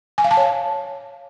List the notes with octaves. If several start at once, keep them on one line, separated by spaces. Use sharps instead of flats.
G#5
F5
A5
C#5